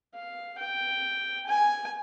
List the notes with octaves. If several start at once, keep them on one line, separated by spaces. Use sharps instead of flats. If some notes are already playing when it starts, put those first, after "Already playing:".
F5
G5
G#5